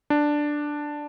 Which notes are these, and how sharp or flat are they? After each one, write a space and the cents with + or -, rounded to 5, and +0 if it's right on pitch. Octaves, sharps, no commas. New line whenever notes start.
D4 +5